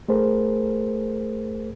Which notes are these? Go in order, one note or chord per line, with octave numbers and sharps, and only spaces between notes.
A3 G#4 A#4 C5